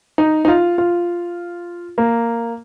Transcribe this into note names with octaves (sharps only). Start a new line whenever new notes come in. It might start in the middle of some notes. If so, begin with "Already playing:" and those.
D#4
D#4
F4
F4
A#3